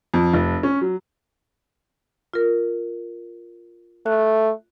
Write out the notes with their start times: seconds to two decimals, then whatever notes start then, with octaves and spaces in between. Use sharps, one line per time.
0.14 F2
0.34 F1
0.63 C#4
0.81 F#3
2.33 F4 A#4
4.06 A3 F#6